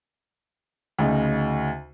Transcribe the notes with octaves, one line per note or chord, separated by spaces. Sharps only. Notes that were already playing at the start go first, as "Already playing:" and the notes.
D2 C#3 D#4